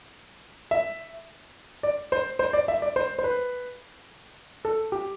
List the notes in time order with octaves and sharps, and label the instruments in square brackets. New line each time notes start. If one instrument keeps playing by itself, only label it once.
[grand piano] E5
D5
C5
C5
D5
E5
D5
C5
C5
B4
A4
G4